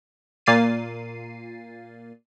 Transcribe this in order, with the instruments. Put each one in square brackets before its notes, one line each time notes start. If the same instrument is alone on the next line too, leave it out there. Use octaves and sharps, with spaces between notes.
[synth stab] A#2 A#3 A6 C7 D#7